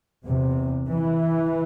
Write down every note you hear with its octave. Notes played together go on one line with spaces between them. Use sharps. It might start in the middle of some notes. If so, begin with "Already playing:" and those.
E2 C3
E3